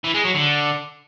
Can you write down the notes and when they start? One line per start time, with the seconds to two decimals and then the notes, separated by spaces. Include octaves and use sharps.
0.04 E3
0.14 G#3
0.25 F#3
0.35 D3